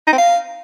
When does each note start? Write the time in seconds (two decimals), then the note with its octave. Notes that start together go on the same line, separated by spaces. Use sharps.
0.07 D#4
0.13 C4
0.18 F5